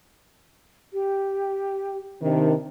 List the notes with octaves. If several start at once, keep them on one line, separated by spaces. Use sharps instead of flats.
G4
C3 D#3 D4